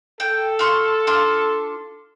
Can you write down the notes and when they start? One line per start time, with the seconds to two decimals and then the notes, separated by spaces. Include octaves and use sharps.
0.20 A4 G5
0.59 F4 C6 C#6
1.07 D4 F4 C6